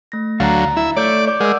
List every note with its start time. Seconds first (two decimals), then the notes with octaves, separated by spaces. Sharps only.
0.12 A3 A#6
0.40 D2 F#3 F5 A#5 A6
0.77 E4 E5
0.97 A3 C#5 D5 G6
1.27 D5 D6 G6
1.40 G#3 A#4 F#5 E6